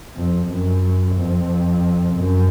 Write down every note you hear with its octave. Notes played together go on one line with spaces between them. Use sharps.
F2
F#2
F2
F#2